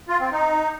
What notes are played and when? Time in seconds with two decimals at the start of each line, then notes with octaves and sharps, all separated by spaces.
0.08 F4
0.20 C4
0.32 D#4